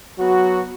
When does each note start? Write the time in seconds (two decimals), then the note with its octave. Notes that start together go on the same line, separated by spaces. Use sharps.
0.19 F#3 B3 F#4